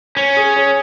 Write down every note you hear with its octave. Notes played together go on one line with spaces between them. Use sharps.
C#4 C#5
G#4
C#5